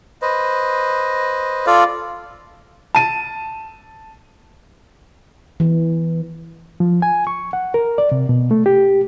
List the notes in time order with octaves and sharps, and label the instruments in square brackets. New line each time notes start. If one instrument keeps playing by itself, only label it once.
[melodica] B4 C5 D#5
F4 A4 D5 F5
[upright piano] A5 D#7
[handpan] E3
[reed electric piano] F3
G#5
C#6
F#5
A#4
D5
C3
B2
A3
G4